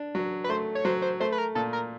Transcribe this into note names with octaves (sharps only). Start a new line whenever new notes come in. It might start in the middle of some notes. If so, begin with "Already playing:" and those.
Already playing: D4
F#3
B4
A3 C5
C#5
F#3 C5
C5
A3 C5
B4
A#4
A#2 A4
A#4